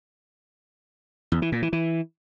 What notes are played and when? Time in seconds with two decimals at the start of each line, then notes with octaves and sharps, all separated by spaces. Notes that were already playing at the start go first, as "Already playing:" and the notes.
1.32 E2
1.42 E3
1.52 A#2
1.62 E3
1.73 E3